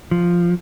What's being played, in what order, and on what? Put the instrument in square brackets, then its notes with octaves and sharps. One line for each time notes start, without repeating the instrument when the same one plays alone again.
[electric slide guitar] F3